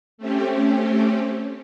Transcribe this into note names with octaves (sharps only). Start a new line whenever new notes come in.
A3 C4 C#4 G4